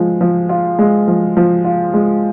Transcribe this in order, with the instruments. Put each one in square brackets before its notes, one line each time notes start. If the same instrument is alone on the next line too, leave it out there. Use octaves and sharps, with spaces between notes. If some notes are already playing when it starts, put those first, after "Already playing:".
Already playing: [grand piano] F3 G#3
F3
F4
G#3
F3
F3
F4
G#3